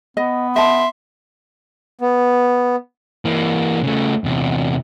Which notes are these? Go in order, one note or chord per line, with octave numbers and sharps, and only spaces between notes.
B3 D#5
D#5 E5 A5 C6
B3
E3 A#3
C#3 A3
E2 C3